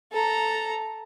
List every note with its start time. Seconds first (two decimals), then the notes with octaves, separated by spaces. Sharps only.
0.12 A4 A#5